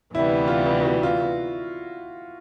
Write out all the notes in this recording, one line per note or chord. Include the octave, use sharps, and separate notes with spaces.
D2 C3 E3 G3 B3 E4
F4
F#4
F4